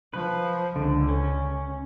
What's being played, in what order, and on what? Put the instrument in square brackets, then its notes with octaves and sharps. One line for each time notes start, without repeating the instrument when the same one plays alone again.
[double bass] F3 [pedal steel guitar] B4
[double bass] C#2 [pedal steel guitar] D3
[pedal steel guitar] C#4